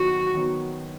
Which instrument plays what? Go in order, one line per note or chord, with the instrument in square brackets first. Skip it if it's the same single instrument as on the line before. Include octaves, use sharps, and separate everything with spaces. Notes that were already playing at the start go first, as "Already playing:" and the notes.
Already playing: [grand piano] D#3 F#3 B3 [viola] F#4
[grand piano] D#3 F#3 B3